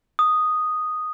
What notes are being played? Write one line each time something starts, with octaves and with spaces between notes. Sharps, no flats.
D#6